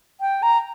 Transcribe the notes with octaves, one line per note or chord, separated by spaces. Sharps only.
G5
A#5